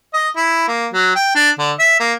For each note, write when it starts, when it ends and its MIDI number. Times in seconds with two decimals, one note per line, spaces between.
0.14 0.29 75
0.37 0.63 64
0.68 0.87 58
0.93 1.13 54
1.15 1.31 79
1.35 1.50 62
1.59 1.72 50
1.79 2.00 76
2.00 2.13 58